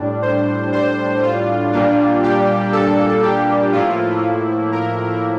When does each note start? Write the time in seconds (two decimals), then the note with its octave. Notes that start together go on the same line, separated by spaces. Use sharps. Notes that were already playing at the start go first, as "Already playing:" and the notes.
Already playing: A2 G3 D4
0.22 C5
0.72 C5
1.22 F4
1.72 A#2 G3 A#3 D4 F4
2.23 G4
2.72 A4
3.22 G4
3.72 A2 F3 A#3 E4 F4
4.72 A#4